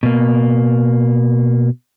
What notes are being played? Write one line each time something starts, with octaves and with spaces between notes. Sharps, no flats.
B2 A#3